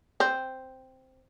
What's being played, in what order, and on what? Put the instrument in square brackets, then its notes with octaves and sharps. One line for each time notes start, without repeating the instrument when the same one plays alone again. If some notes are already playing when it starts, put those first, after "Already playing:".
[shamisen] C4